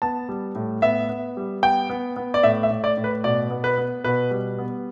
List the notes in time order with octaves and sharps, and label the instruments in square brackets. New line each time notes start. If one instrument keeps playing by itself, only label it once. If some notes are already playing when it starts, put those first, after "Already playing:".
[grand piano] B3 A5
G3
A2
B3 E5
B3
G3
B3 G5
B3
B3
D5
A2 E5
E5
A2
D5
A2
B4
B2 D5
B3
B4
B3
B2 B4
G3
B3